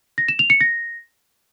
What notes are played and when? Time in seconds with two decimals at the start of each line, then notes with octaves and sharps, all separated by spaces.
0.18 A#6
0.28 E7
0.39 F7
0.50 C#7
0.61 A#6